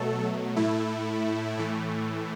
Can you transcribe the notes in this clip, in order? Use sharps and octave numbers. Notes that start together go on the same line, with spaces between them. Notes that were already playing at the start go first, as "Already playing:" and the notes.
Already playing: B2 F#3 A3 A4
A2 A3 E4
A2 E3 A3